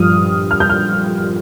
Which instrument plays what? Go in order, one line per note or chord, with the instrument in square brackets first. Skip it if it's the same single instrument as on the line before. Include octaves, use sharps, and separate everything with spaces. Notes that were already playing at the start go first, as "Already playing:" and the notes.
Already playing: [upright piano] G2 F3 D#6 F6
F6
G6
F6